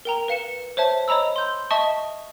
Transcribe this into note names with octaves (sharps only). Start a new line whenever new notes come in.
A#4 G5 A#5
B4 F5 C#7 E7
C5 C#5 E5 A5
C#5 D#5 A#5 B5 E6
C6 G6
D#5 E5 A5 C#6 D#6 G7